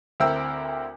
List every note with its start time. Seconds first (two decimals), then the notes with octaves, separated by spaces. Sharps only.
0.20 D2 C4 E4 A#4 G5 E6